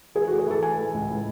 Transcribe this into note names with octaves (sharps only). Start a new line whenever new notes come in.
E3 G#4
F#4
A3
G#4
E3 A4
A3 G#5
E3
C#2
A2